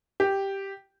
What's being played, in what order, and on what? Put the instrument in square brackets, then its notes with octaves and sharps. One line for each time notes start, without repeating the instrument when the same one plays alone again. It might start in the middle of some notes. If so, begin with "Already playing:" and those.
[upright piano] G4